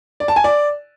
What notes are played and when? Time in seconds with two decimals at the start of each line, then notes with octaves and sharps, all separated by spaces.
0.20 D5
0.28 A5
0.36 G#5
0.44 D5